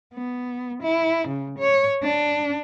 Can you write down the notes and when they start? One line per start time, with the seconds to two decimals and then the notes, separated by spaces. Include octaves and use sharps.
0.14 B3
0.83 E4
1.28 C#3
1.59 C#5
2.03 D4